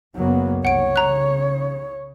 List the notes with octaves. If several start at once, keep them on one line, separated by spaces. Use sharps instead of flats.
F#1 F#3 A#3 B3
C2 C#5 F#5 D7
C#3 A#5 F#6